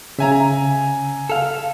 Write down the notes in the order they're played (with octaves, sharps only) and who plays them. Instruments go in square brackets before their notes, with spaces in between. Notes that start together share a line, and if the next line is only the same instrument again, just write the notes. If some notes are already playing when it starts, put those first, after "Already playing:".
[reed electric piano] C#3 [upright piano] E5 G#5 A#5
[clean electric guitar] A4 F5